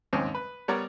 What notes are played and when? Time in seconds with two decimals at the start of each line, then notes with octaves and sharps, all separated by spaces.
0.13 D#2 G#2 C4 C#4
0.35 B4
0.68 G3 B3 A#4 C#5 D5